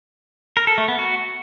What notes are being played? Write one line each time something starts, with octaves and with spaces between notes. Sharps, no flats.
A#4
A4
A3
B3
F#4